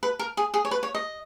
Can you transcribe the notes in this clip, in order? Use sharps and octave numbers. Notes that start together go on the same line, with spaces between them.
B4
A#4
G#4
G#4
C#5
B4
C#5
D#5